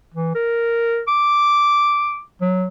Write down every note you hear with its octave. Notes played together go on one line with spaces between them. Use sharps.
E3
A#4
D6
F#3